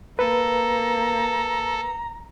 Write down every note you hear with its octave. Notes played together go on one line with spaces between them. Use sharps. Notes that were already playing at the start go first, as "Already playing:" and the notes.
A#3 A4 B4 A#5